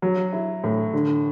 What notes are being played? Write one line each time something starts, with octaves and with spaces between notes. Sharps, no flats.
F#3
E4
A2
D3